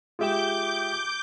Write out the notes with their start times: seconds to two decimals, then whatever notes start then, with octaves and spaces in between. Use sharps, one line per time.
0.19 G#3 F4 G4 E5 G5 D6 G6 E7